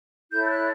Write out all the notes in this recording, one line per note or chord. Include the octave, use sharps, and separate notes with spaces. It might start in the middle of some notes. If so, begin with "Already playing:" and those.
E4 A4 C#5 G6
G6
F#6